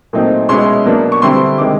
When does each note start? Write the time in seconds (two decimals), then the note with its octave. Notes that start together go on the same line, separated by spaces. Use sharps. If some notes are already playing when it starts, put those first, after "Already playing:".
0.13 A#2 F#3 A3 C4 D#4
0.49 B2 G#3 C#4 E4 C6
0.85 B2 F#3 A#3 D4
1.12 C#6
1.22 D3 G3 C4 E4 C6
1.58 C3 D#3 G#3 D6